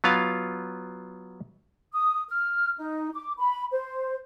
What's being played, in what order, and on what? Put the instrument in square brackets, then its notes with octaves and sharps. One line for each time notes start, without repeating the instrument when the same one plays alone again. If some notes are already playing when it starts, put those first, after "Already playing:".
[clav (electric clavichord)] F#3 B3 F4 F5
[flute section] D#6
F6
D#4
D6
B5
C5